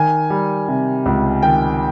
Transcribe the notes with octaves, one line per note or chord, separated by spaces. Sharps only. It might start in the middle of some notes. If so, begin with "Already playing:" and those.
Already playing: D#3 G#5
G3
C3
C#2
D#3 G5